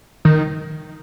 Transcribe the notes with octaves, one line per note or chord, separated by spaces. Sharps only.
D#3